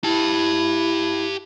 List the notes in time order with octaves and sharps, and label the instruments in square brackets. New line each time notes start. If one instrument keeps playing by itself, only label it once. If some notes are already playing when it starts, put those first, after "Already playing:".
[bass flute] E4 [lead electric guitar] G4 A5